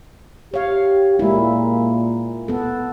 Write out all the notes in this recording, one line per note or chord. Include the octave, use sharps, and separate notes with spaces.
G4 C#5 F5
A#2 G#3 E4
B3 A4